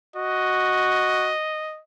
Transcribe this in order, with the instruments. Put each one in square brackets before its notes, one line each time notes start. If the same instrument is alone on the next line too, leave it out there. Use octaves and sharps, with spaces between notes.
[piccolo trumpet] F#4 [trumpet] D#5